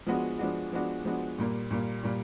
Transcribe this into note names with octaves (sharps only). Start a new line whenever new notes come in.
F3 G#3 B3 D4 F#4
F3 G#3 B3 D4 F#4
F3 G#3 B3 D4 F#4
F3 G#3 B3 D4 F#4
A#2 G3 A#3
A#2 G3 A#3
A#2 G3 A#3